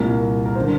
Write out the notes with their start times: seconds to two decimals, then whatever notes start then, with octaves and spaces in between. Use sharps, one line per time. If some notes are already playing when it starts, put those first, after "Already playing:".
Already playing: C2 A#2 A#4
0.46 A#4
0.55 C5
0.61 D3